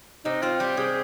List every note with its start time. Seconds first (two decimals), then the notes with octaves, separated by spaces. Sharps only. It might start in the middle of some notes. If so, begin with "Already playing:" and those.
0.24 C3 D#4
0.42 C4 F4
0.60 G3 G4
0.77 C3 G#4